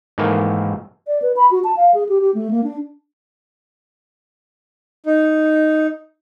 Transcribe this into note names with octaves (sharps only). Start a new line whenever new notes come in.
G#2 D#3 E3 A3 A#3
D5
B4
B5
F#4
A5
F5
G#4
G4
G4
A3
A#3
D4
D#4